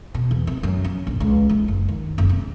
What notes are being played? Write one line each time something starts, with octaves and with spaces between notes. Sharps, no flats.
B2
E2
C3
F#2
C#4
A#1
C#2
E4
F#1
D#3
F#1
C3